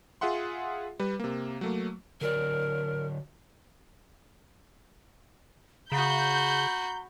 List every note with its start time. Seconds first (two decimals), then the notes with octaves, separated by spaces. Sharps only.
0.21 F4 G#4 E5 F#5 C6
0.99 G3 B4
1.20 C3 A#3
1.61 F#3 A3 A#3
2.21 D3 F#3 A#4 D5
5.92 C#3 F#4 A#5 B5 G6